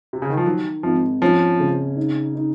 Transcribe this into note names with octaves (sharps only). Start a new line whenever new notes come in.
C3
C#3
D#3
F3
D#3 F#3
G#1 F3
F3 C#4
C#3
D#4
D#4